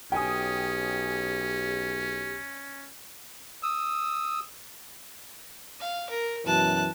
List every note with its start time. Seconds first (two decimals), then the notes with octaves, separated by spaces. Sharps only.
0.12 B1 C#4 G4 G5 G#5 D#6
3.63 D#6 E6
5.80 F5
6.10 A#4
6.46 F#2 B2 E3 A5 F#6